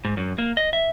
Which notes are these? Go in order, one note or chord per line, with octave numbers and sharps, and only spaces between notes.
G#2
F#2
A#3
D#5
E5